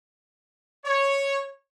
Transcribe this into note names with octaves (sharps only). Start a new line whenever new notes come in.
C#5